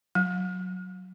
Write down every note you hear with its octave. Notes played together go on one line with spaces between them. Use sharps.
F#3